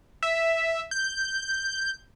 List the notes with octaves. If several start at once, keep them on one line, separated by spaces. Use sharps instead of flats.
E5
G6